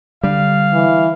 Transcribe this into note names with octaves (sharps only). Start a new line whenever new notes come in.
D3 G3 F5
E3